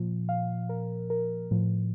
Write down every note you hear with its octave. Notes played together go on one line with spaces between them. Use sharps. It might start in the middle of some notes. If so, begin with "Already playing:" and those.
Already playing: A#2 F3
F5
A#4
A#4
A2 F3